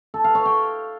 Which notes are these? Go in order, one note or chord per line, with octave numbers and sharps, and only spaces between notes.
A4
F5
C#5
G5